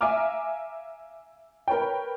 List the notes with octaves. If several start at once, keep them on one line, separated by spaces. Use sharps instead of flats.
E5 F5 G#5 A#5 D6 F6
A#4 B4 C#5 G5